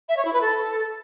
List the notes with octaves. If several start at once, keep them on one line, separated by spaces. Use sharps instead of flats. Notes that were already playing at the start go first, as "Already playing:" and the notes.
E5
C#5
E4
B4
A4